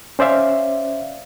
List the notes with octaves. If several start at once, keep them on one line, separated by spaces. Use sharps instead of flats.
C#4 C5 D5 E5 F5